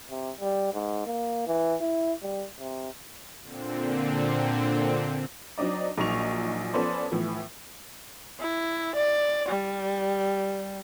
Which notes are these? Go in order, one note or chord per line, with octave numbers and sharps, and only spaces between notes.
C3
G3
G#2
A#3
E3
E4
G3
C3
A#2 D3 C4
F#3 C4 D4 D#4 D5
A#1 A#2 F#3 D#4 C#6 F7
F3 B3 C#4 A4 C5 D5
A2 E3 F3 B3
E4
D5
G3